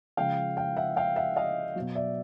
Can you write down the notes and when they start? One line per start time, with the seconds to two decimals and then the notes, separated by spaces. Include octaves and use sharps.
0.17 C#3 F3 G#3 F5 G5
0.57 F5 G5
0.77 E5 F#5
0.96 F5 G5
1.16 E5 F#5
1.36 D#5 F5
1.75 B2 F#3
1.95 D5 E5